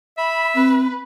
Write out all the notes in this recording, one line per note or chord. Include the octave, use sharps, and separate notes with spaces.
E5 B5
C4 B4